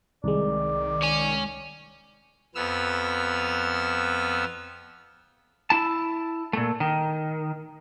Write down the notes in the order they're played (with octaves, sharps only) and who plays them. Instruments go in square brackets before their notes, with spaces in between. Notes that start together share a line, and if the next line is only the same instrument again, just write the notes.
[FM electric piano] C2 G#3 [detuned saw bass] D#3 [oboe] D5
[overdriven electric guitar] C#5 G#5
[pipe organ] F2 B3 E6 F6
[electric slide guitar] E4 A5
A#2 A3
D#3